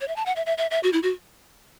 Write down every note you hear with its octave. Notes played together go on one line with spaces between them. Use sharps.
C#5
E5
A5
F#5
E5
E5
E5
E5
F#4
E4
F#4